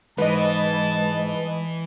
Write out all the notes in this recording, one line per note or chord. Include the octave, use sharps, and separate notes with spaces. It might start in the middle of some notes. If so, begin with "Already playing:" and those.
G#2 E3 B4 D#5 A5